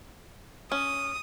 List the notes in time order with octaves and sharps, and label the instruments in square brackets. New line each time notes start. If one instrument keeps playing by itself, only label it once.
[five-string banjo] C#4 [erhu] D#6